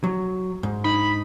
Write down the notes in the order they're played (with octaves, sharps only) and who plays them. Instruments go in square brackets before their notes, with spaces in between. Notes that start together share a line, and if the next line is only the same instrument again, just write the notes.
[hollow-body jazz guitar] F#3
G#2
[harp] D#4 [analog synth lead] B5